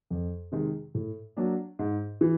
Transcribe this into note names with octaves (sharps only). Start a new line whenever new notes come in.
F2
C3 D#3 G#3
A2
F#3 A#3 D4
G#2
E3